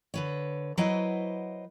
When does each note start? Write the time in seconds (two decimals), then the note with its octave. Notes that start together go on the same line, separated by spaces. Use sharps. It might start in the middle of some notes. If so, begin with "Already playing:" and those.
0.14 D3 B4 C#5
0.77 F#3 E4 B4 C5 D#5 F#5